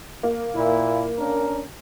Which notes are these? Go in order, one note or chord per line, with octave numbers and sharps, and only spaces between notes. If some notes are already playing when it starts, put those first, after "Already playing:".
A#3
A#2 E4
C#4 D4 A#4